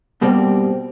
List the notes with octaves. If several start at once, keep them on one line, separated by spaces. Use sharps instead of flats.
G2 B2 G3 A#3 C4 G4